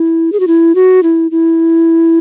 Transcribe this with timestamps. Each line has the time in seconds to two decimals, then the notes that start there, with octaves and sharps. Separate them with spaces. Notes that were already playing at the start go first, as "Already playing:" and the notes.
Already playing: E4
0.32 G#4
0.40 F#4
0.47 E4
0.75 F#4
1.03 E4
1.31 E4